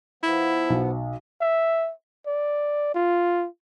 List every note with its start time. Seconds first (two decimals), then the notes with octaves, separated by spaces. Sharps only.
0.23 F3 B3 E4
0.70 B1
1.41 E5
2.27 D5
2.95 F4